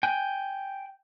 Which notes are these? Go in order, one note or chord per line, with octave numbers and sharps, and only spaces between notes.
G5 G#5 F#6